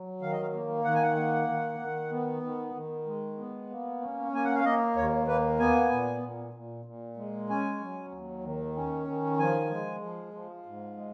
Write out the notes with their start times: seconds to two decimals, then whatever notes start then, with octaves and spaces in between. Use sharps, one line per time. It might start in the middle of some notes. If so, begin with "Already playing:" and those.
Already playing: F#3
0.21 D#3 F5
0.32 D#5
0.42 F5
0.53 A#3
0.84 D#3 F#5
0.94 G#5
1.02 F#5
1.16 A#3
1.48 D#3
1.79 D#3
2.11 B3
2.43 D#3
2.75 D#3
3.06 G#3
3.38 B3
3.70 A#3
4.01 C#4
4.32 A#3 G#5
4.44 F#5
4.55 F5
4.64 A#3 D#5
4.96 D#2 C#5
5.27 A#3 B4
5.59 B3 G#5
5.91 A#2
6.23 A#2
6.54 A#2
6.85 A#2
7.17 G#3
7.49 C#4 G#5
7.81 F#3
8.12 D#2
8.44 D#3
8.76 C#4
9.08 D#3
9.39 F3 G#5
9.70 G#3
10.02 F3
10.34 F3
10.66 G#2
10.97 G#3